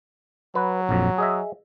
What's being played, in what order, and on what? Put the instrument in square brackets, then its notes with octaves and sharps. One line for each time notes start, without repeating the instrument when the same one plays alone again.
[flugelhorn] F#3 [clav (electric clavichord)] B4
[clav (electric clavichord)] A#1 F2
G#4 D#5 E5